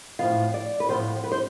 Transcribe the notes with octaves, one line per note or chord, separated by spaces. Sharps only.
A2 F3 B3 F4 F5
D5
B4
A2 F3 B3 C5
B4
C5